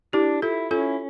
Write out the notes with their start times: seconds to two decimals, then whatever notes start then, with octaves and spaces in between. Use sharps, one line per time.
0.13 D4 E4 G4
0.42 E4 F4 A4
0.71 C#4 F4 A4